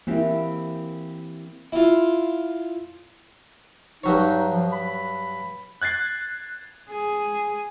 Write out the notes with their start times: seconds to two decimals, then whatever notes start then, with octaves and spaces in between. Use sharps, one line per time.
0.07 E3 A#3 C4 E4 G4
1.72 E4 F4
4.04 G2 F#3 D#4 C#5
4.49 F3
4.72 B5
5.82 F#6 G#6 A6 C7
6.90 G#4